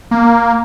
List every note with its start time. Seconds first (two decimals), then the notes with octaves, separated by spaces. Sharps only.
0.11 A#3